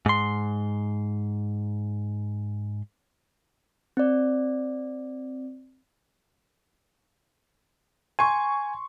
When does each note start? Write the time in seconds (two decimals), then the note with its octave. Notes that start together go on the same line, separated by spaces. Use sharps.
0.06 G#2 C6
3.97 C4 D5
8.19 G#5 C6 C#6